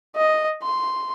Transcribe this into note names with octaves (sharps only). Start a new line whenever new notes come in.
D#5
C6